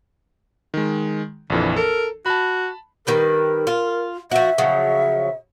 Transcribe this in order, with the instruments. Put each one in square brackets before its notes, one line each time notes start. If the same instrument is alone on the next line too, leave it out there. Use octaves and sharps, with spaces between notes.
[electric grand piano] D#3 G#3
[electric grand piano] A#1 F2 E3 [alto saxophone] D3
[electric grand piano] A4 [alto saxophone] A#4
[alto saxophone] F#4 [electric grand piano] A5 B5
[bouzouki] D#3 G3 B4 [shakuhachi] A#4
[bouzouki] F4
[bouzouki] F3 F#4 [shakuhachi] E5
[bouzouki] C#3 F3 F#3